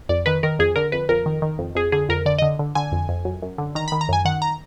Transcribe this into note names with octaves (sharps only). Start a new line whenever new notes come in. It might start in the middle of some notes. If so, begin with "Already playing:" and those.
F2 D5
D#3 B4
D#3 A#4
F2 G#4
D3 A#4
F2 B4
F2 A#4
D#3
D#3
F2
F2 G#4
D3 G#4
F2 A#4
D3 D5
D3 D#5
D3
D3 G#5
F2
F2
F#2
F#2
D3
D#3 A#5
B5
D#3
A#5
F#2 G#5
D#3 F#5
A#5